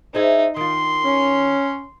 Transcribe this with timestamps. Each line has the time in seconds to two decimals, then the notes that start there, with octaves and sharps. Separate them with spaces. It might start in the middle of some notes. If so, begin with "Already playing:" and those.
0.15 D#4 E4 G#4 C5
0.56 D#3 F4 C6
1.04 C#4